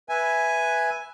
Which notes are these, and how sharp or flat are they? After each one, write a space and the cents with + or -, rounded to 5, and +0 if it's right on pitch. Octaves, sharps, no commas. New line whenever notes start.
B4 +0 E5 +0 G#5 +0